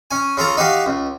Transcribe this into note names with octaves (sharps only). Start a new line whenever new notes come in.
C#4 G#5
C#3 F4 A4 A#5
D#4 F#4 G4 F5
C#2